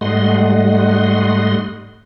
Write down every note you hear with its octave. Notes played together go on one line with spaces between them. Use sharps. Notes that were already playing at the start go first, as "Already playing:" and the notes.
G#2 G3 A3 D#5 F#5 C6